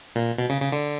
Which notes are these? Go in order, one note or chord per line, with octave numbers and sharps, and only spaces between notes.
A#2
B2
C#3
C#3
D3